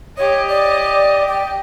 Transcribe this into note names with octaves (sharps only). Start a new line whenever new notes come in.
G4 C#5 D#5
D5
G5